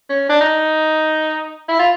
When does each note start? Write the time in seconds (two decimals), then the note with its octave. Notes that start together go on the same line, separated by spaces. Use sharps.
0.09 C#4
0.29 D4
0.41 D#4
1.69 E4
1.79 F4